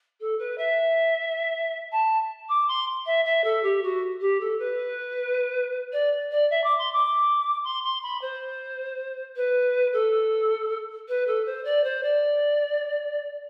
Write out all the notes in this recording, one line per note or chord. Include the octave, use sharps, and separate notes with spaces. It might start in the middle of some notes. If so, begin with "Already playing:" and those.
A4
B4
E5
A5
D6
C6
E5
E5
A4
G4
F#4
G4
A4
B4
D5
D5
E5
D6
C6
D6
C6
C6
B5
C5
B4
A4
B4
A4
C5
D5
C5
D5